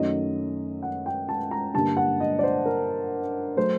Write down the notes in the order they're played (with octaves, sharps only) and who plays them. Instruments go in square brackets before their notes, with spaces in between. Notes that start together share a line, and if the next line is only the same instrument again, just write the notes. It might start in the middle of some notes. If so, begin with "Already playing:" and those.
Already playing: [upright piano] F#2 D#3 F#3 A3 D#5
F#5
G5
A5
A#5
G2 D3 G3 A#3 A5
F#5
D#5
D5
C5
A#4
F#3 A3 C5